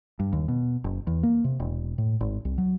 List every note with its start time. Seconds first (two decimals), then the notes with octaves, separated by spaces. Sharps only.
0.20 G2
0.33 D#2
0.48 B2
0.84 F#1
1.07 E2
1.23 A#3
1.44 C3
1.60 E1
1.98 A2
2.21 G#1
2.45 C2
2.58 F#3